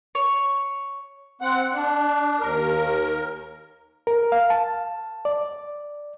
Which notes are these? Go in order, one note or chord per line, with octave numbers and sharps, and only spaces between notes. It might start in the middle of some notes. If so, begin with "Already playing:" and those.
C#5
C4 F#5
D4
D#2 A#4
A#4
F5
A5
D5